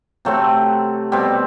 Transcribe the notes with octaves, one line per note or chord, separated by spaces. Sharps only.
C3 F#3 A3 C4
B2 G3 C4